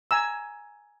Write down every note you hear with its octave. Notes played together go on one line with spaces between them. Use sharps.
G#5 A#5 E6